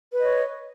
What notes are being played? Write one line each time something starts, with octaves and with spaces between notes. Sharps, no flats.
B4 C#5 D#5